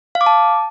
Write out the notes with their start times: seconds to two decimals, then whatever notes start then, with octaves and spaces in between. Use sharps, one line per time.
0.15 F5
0.21 D6
0.26 A5